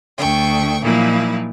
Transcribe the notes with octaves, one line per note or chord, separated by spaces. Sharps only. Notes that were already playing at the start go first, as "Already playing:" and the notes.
D2 G5 C#6
A#2 F3 F#3 A#3 D#4 E4